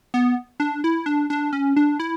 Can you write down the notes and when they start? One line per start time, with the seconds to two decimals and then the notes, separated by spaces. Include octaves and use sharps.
0.14 B3
0.60 D4
0.84 E4
1.06 D4
1.30 D4
1.53 C#4
1.76 D4
2.00 E4